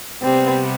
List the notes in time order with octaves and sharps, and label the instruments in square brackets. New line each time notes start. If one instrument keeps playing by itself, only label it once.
[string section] C3 G3 B3 [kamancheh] C4